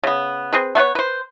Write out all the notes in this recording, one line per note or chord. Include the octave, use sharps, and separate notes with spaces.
C#3 B3
C4 G#4 B4
A3 B3 B4 C#5
B4 C5